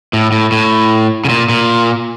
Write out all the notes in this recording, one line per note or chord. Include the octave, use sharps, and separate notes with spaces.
A2
A2
A2
C#3
A#2
A#2